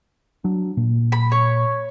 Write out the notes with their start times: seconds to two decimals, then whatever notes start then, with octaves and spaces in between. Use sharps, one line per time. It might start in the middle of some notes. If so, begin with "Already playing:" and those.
0.44 F#3 D4
0.77 A#2
1.12 B5
1.32 C#5